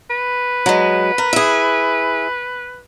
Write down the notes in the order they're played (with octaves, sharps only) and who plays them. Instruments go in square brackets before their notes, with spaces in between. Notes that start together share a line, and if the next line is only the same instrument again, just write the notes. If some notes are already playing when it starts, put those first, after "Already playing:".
[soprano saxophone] B4
[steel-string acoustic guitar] F#3 G#3
A#4
E4 G#4